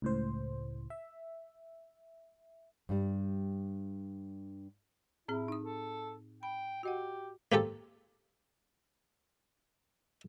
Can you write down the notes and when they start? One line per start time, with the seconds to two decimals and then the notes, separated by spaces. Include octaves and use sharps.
0.02 C#2 A2 C5
0.90 E5
2.89 G2 G3
5.28 A2 C4 E4 G#4
5.48 D#4 D#6
5.63 A4
6.43 G5 B5
6.83 F#4 G4 D#5 F#5
7.52 A#3 C4 G4 A4